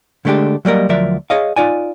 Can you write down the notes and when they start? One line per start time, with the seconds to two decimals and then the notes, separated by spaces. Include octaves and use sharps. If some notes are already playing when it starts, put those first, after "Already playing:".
0.25 D3 G#3 A3 D4 G4
0.65 F#3 G3 A#3 A#4 D#5
0.89 D2 F3 F#3 A#4 D5 E5
1.30 G#4 C#5 D#5 F5
1.56 D#4 F4 D5 G#5